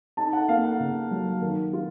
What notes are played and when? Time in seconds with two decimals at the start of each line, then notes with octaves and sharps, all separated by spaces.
0.17 D#4 A5
0.33 F#5
0.49 A#3 F5
0.64 F#5
0.80 C#3
1.11 F#3
1.42 D#3
1.73 F4